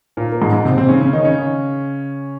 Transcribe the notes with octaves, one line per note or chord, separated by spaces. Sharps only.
A#2 A#3
A#3
G#2 G#3
G#2 G#3
C3 C4
C3 C4
C#3 C#4
C#3 C#4
D#3 D#4
C#3 C#4